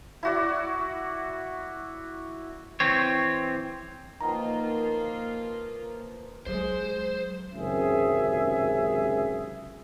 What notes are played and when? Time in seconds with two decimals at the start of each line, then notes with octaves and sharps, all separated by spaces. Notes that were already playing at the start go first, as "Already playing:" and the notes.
0.23 E4 F#4 D5
2.80 E3 C4 C#5
4.21 D#3 F3 A#3 B3 F4 A#5
6.46 F#3 G#3 C5
7.53 G#1 C#2 F#2 C3 G#4 E5